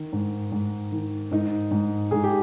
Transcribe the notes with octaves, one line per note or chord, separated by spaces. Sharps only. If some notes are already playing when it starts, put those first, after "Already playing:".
Already playing: D#3
G#2
G#2
D#3
G#2 D#4
G#2
G#2 G#4
G4